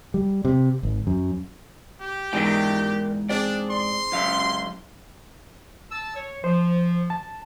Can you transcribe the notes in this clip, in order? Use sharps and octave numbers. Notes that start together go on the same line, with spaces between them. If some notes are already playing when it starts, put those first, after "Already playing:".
G3
C3
G#1
F#2
G4
G#2 E3 B3 D#4 A#4 D5 G5
C4 D4 G#4 D5
C6
C#2 F#2 F5
A5 E6
C#5
F3 C5
A5